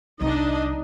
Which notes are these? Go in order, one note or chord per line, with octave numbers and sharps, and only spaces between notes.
C2 F#3 D4 D#4 D#5